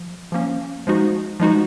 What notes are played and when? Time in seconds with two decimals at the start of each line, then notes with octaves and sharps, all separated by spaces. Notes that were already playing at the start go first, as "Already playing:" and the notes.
Already playing: F3
0.32 F3 A#3 C#4
0.87 F3 G#3 D#4 F#4
1.40 F3 G#3 D#4 F#4